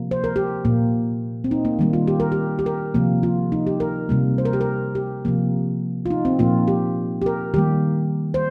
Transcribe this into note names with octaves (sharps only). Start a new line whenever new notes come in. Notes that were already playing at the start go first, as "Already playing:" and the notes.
Already playing: C3 F3 A#3
C5
A#4
G4
A#2 A#3
C4
D#4
A#3
D#3 G3 A#3
F4
G4
A#4
G4
G4
A#4
C3 F3 A#3
F4
D#4
G4
A#4
C3 G3 A#3
C5
A#4
G4
A#4
G4
C3 F3 A#3
F4
D#4
C4
A#2 F3 A#3 F4
G4
G4
A#4
D#3 G3 A#3 G4
C5